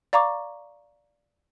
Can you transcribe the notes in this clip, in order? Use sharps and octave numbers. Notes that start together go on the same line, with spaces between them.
D5 F5 A#5 C#6 D6